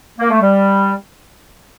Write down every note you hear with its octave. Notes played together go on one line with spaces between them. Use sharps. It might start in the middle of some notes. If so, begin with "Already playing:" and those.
A#3
A3
G3